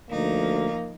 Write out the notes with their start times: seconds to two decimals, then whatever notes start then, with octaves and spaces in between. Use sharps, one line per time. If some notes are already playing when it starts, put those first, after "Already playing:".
0.10 D2 F3 A#3 D#4